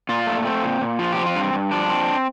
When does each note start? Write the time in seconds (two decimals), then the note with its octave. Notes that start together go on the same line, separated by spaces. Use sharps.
0.09 A#2 F4
0.27 A3
0.45 C4
0.63 A#2
0.81 A#2
0.99 F3 F4
1.13 G4
1.18 C4
1.26 F4
1.35 G2
1.53 G2
1.71 F3 D4
1.89 C4